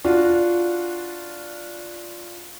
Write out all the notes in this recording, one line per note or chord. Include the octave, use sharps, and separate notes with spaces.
D4 F4 F#4